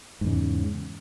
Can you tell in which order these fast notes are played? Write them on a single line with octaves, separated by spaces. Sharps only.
G#2 E2 C#3